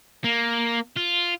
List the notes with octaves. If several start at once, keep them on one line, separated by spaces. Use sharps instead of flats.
A#3
F4